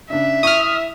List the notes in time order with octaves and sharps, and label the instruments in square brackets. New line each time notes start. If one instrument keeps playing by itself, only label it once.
[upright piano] C#3 D4 [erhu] E5
[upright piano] E4 C#6 [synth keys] D#6 F6